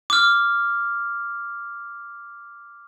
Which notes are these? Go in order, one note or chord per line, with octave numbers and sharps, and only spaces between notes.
D6 F6